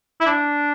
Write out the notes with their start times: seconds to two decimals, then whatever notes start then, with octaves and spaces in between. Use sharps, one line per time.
0.20 E4
0.27 D4